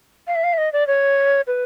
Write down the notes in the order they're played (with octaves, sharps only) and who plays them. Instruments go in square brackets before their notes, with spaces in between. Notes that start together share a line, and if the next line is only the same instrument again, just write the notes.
[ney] F5
E5
F5
E5
D#5
D5
C#5
B4